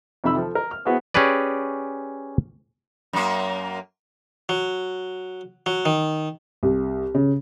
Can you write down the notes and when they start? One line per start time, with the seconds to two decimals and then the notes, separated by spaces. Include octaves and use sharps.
0.24 F2 C3 D#3 E5 B5 E6
0.37 F3 A4
0.55 A#4
0.71 F6
0.85 B3 E4 F#4 G#4 C5
1.14 C#4 G4 G#4 B4 D5
3.13 F#2 A#3
4.49 F#3
5.66 F#3
5.85 D#3
6.63 C2
7.15 C#3